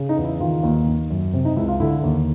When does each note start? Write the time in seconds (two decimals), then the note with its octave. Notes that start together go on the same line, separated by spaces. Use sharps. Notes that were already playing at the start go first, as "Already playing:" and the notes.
Already playing: C#3
0.09 D#4
0.17 E2
0.24 E4
0.40 D#3 F4
0.63 D#2
0.87 D#3
1.10 F#2
1.33 C3
1.45 D#4
1.57 C#2 E4
1.68 F4
1.80 D3 E4
2.03 D#2